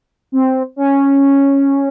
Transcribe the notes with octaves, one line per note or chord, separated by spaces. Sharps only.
C4
C#4